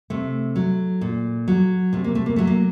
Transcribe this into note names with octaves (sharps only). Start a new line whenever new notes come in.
C3 A3
F#3
A#2
F#3
C3 A3
A#3
A3
A#3
F#3 A3
A#3